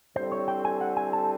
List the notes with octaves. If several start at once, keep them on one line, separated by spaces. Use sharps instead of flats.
D3 G3 C4 E4 A4 C5
C#5
G5
G#5
F#5
G#5
A5